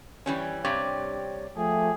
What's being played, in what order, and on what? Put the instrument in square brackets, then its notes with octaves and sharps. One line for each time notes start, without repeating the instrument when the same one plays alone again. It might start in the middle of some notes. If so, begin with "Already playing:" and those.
[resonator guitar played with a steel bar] E3 G3 C#4
[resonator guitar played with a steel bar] G2 C3 [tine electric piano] G4 C#5 D5
[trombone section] F3 A3 [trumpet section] G4 G#4 G#5